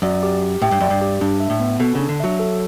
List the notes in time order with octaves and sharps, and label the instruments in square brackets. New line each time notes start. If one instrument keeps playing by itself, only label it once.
[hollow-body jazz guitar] F#2 [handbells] D5
[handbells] G4
G4
[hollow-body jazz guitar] A2 [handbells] G5
[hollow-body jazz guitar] G2
[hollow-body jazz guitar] F#2 [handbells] D5
[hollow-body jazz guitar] G2
[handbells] G4
[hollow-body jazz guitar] G2 [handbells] D4
[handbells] E5
[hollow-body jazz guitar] A2
[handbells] B3
[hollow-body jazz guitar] B2 [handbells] A4
[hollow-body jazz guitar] C#3 [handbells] D4
[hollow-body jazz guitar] D3
[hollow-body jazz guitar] F#3 [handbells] E5
[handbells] A4